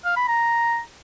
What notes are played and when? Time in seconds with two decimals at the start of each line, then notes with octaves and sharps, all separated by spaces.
0.05 F5
0.16 B5
0.28 A#5